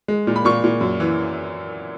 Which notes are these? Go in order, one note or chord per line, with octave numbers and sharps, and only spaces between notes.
G#3
A#2
B5
A#2 C#6
A#2
F#2
E3